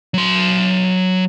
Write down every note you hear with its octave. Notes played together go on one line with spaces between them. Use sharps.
F#3 C6